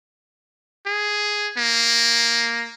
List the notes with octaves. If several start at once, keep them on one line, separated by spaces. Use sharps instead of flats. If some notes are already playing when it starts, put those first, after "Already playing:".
G#4
A#3